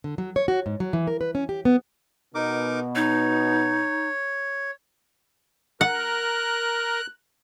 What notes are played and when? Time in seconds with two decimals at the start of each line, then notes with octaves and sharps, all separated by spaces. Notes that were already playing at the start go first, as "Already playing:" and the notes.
0.04 D3
0.18 F#3
0.36 C#5
0.48 F#4
0.66 G#2
0.80 F#3
0.93 E3
1.07 A#4
1.21 B4
1.35 C#4
1.49 G4
1.65 B3
2.35 B2 D#4 A#4 D6
2.95 D#4 C#5
5.81 A#4 F#5 F#6